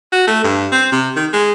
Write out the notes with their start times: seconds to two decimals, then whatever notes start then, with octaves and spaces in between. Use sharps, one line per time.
0.12 F#4
0.27 A3
0.44 G2
0.72 C4
0.92 C3
1.16 D#3
1.33 G#3